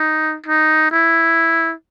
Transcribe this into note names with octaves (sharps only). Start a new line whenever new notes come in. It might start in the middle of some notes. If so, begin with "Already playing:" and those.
Already playing: D#4
D#4
E4